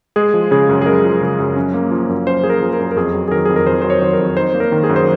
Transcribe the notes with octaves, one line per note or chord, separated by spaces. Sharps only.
G#3 G#4
F3
C#3 G#4
F#2
G#4
G#3 A#4
F3
C#3
F#2
C#4
A#3
F3
F#2
C#4 C5
A#3 G#4
A#4
F3
A#4
F#2
A#4
F2 G#4
F#3
G#4
D#3 A#4
F2 G#4
A#4
F2 C5
F#3 C5
C#5
D#3 C5
A#4
F2
D#4 C5
A#3
A#4
D#3
G#4
F#2
C5